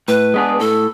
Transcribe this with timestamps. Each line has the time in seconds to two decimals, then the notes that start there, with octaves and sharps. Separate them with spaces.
0.08 A2 B4
0.34 G#3 B3 D4 G#4
0.59 A2 A4